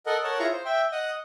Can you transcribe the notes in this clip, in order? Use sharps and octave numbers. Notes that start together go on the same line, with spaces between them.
A4 A#4 D#5 F#5
A#4 C#5 F#5 A5
E4 F4 G#4 C#5 A#5 C#6
C5
E5 G5
D#5 F#5 D#6